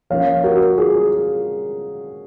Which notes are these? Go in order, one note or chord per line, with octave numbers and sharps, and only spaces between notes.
F3 A#3 C#4 C#5 F5
F#4 A#4
F4 G#4